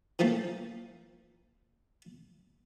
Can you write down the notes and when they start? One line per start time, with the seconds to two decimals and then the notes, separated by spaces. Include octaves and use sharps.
0.19 E3 F3 A3 A#3